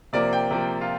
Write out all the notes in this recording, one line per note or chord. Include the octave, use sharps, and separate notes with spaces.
C3 F3 A#3 D5
G5
C3 F3 A#3
F4